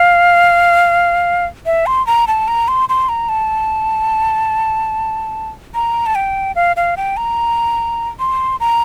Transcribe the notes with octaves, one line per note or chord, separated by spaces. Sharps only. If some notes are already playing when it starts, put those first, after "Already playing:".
Already playing: F5
E5
C6
A#5
A5
A#5
C6
C6
A#5
A5
A#5
A5
G5
F5
F5
G5
A#5
C6
A#5